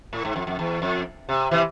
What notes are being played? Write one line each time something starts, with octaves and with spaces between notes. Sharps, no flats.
A2
G#2
F2
F2
E2
F2
C3
C3 E3